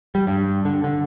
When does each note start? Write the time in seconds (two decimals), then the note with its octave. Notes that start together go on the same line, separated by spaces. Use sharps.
0.15 G3
0.27 G2
0.65 D3
0.84 D3